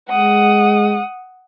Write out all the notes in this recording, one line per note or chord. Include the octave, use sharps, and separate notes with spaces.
G#3 F#5 D#6